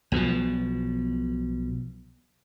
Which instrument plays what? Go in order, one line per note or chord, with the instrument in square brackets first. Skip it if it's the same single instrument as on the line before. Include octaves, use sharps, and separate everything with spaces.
[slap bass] B1 B2 D3 F3